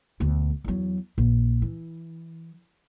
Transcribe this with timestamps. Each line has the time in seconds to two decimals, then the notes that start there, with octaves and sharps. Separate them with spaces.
0.20 E1 D2
0.64 E2 F#3
1.18 A#1
1.62 E3